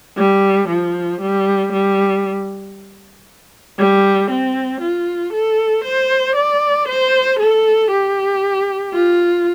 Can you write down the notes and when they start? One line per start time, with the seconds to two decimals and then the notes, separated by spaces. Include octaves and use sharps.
0.17 G3
0.69 F3
1.21 G3
1.73 G3
3.79 G3
4.31 C4
4.81 F4
5.33 A4
5.84 C5
6.36 D5
6.89 C5
7.39 A4
7.91 G4
8.94 F4